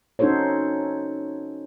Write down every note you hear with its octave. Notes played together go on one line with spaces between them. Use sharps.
C#4 D#4 F#4 A4 C5 C#5